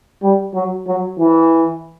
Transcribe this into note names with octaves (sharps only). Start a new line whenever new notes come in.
G3
F#3
F#3
E3